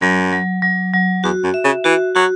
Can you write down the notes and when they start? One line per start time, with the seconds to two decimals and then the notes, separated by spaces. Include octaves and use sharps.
0.02 F#2 F#3
0.32 F#3
0.62 F#3
0.93 F#3
1.24 E2 F#4
1.44 F#2
1.54 E5
1.65 C#3
1.84 E3 F#4
2.15 F#3 F#4